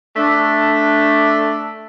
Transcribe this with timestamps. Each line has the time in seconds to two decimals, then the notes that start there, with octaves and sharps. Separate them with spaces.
0.17 A3 D4